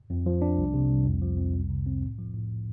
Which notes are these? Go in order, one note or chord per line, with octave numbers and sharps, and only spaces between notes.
F2
F3
D4
C2
C3
C2
F2
F3
F2
C2
C3
C4
A2
F3
A2